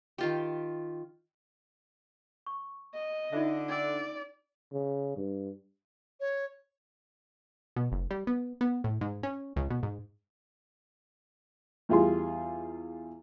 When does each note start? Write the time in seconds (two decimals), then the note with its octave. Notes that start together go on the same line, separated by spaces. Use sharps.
0.18 D#3 F4 G4
2.46 C#6
2.94 D#5
3.33 D3 D4 D#4 F4 E5
3.69 C#4 D5 G5 E6
4.72 C#3
5.17 G2
6.20 C#5
7.76 B2
7.92 F#1
8.11 G3
8.27 B3
8.61 B3
8.84 A2
9.01 G#2
9.23 C#4
9.56 C#2
9.70 B2
9.83 G#2
11.89 E2 G3 F4 G#4 C6